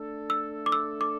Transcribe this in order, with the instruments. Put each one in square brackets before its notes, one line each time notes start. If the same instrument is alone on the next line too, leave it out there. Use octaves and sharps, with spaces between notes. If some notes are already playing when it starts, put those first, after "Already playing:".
Already playing: [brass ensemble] A3 D4 A4
[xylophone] E6
D6
E6
D6